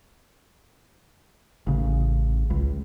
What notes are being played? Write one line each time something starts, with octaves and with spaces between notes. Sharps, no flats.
A1 C#3
C#2